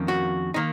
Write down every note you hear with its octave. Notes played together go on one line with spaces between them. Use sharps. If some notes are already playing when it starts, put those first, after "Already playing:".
Already playing: F2 D#3 A#3 C#4
F#4
D#3 A#3 D#4